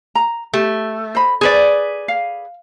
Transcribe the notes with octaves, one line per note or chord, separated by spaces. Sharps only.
A#5
A3 G4
C5 D#5 B5
G#4 B4 C5 D5
F5